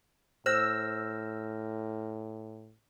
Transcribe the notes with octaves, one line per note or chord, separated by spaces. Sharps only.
A2 C5 E6 F6 G6 A#6